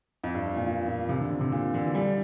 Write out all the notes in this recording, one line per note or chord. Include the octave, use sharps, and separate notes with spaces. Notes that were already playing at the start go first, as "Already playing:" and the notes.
F2
G2
A#2
A#2
A#2
C3
D3
C3
C3
A#2
D3
E3
G3